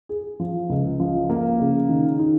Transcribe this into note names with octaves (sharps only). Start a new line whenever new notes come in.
G#4
F3
C#2
F3
A#3
C#3
D#3
D#4